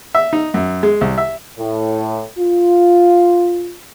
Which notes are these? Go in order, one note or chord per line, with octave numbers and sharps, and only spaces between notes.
E5
D#4
F#2
G#3
C2
E5
A2
F4